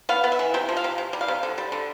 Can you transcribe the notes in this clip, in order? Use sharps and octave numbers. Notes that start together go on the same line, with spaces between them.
B3 F5
B3
E5
E3
C3 G5
F3
F5
C3
C3
G3
F5
C3
D3
G3
D3